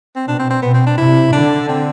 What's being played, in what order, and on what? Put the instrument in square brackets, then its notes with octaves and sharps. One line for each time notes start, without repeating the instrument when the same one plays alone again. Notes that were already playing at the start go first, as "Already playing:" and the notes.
[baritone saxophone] C4
[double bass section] B2 [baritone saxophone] D4
[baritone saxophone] C4
C4
[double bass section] B2 [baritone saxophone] B3
[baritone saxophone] C4
D4
[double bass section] C3 [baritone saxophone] E4
[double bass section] D3 [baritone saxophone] D4
[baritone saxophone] C4